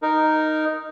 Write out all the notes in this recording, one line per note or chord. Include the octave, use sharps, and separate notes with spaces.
D#4 A#4